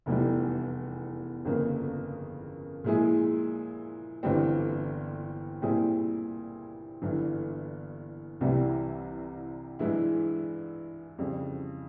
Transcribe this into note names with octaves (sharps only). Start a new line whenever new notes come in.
F1 E2 E3 G3
G1 F2 C#3 F3 A#3
A#2 F3 G#3 E4 G#4
G1 G2 E3 G3 C4
A#2 G3 C4 E4 G#4
G1 G2 E3
C2 C3 E3 G3
G2 E3 G#3 E4
F2 C#3 G3